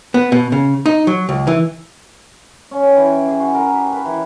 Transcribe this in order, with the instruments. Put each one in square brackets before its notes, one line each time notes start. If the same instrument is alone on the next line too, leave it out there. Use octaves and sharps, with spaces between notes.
[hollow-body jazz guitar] B3
B2
C#3
D#4
F#3
C#2
E3
[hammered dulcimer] C#4
G5
E3
G#4
F#4
A#4
G4
B4
E3